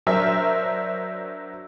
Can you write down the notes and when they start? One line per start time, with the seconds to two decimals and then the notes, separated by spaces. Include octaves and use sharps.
0.07 F#3 D4 A#4 C5 E5